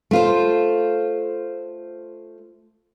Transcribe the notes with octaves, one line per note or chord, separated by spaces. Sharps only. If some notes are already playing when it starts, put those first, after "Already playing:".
A3 F4 C5